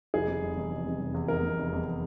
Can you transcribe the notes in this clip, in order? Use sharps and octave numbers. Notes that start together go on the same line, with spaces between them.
F1 G#4
C3
F1
E2
F1
C3
F1
E2
F1 A#4
C3
F1
E2